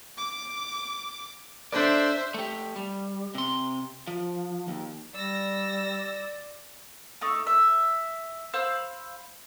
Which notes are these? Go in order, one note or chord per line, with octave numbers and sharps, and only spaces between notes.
D6
D4 A4 C5 D5 E5
A3 G4
G3
C3 C6
F3
D#2
G3 D5 E6 A#6
A3 D#4 C#6
E5
C5 F5 B5 E6